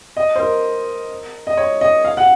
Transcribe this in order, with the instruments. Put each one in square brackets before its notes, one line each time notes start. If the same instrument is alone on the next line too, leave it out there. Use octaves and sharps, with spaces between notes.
[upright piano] D#5
C5
A#4
D#5
C#5
D#5
F5
F#5